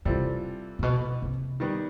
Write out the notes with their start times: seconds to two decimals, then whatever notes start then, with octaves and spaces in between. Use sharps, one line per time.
0.05 C3 E3 G3 C4 F4 A4
0.79 A#2
0.83 B2
1.22 C3
1.60 D#3 G3 B3